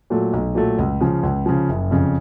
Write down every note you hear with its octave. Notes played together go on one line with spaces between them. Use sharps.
A#2 F#3 A3
B1
A#2 F#3 A3
C#2
C#3 F3
C#2
C#3 F3
F#1
F2 C#3